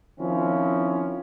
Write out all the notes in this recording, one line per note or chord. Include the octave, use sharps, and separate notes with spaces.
D#3 F3 C4 C#4 E4